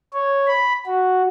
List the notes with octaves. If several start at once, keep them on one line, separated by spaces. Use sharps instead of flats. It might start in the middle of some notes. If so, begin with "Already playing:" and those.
C#5
B5
F#4